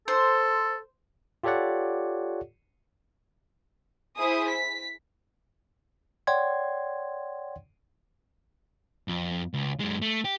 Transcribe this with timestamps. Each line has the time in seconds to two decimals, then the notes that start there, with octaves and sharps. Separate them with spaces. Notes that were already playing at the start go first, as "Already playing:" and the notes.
0.08 A4 C5
1.43 F4 G4 A4 C#5 D5 F#5
4.18 E4 G#4 C5 D#6
4.50 B6
6.27 C#5 D5 F#5 G5 C6 G#6
9.08 F2
9.54 C#2
9.80 F#2 G#3
10.02 A3
10.25 G4